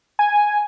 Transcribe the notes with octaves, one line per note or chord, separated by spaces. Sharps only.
G#5